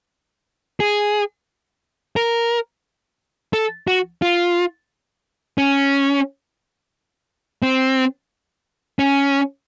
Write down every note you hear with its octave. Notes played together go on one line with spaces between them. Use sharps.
G#4
A#4
A4
F#4
F4
C#4
C4
C#4